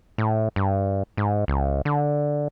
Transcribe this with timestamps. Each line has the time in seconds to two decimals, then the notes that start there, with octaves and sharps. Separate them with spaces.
0.18 A2
0.56 G2
1.17 G#2
1.48 C#2
1.85 D3